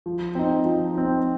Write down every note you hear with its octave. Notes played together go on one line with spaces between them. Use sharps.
F3
C4 D#4
F3
C4 D#4